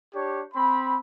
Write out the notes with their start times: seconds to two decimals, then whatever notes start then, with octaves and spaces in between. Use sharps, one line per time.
0.14 D4 G4 C#5
0.53 C4 B5